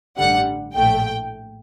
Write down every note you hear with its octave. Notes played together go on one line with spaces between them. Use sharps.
A1 G2 D3 G3 F#5
A#1 A2 A3 G5